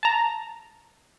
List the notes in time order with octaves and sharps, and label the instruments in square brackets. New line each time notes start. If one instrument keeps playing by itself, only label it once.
[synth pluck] A5 A#5